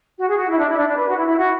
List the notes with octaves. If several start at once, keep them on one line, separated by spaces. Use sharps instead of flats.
F#4
G#4
F#4
E4
D4
E4
D4
D4
B4
F#4
E4
E4
F#4